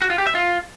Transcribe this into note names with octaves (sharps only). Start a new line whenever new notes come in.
F#4
F4
G4
E5
F4